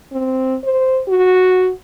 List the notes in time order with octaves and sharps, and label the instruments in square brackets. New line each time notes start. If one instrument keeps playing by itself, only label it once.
[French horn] C4
C5
F#4